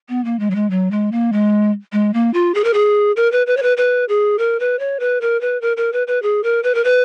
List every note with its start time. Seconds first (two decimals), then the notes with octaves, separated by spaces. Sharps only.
0.09 B3
0.25 A#3
0.39 G#3
0.50 F#3
0.55 G#3
0.70 F#3
0.91 G#3
1.12 A#3
1.32 G#3
1.93 G#3
2.14 A#3
2.34 F4
2.55 G#4
2.64 A#4
2.74 G#4
3.16 A#4
3.32 B4
3.47 B4
3.57 C#5
3.63 B4
3.77 B4
4.09 G#4
4.39 A#4
4.60 B4
4.79 C#5
5.00 B4
5.21 A#4
5.41 B4
5.61 A#4
5.77 A#4
5.93 B4
6.07 B4
6.22 G#4
6.44 A#4
6.63 B4
6.75 A#4
6.84 B4